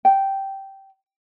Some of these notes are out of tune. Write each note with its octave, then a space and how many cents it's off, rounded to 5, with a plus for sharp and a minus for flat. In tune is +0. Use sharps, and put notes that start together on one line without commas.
G5 -10